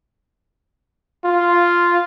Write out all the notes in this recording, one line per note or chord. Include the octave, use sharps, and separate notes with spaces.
F4